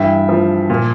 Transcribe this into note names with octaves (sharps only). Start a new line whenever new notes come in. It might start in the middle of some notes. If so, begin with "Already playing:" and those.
Already playing: G2 E3 E5 G5
F3
A#2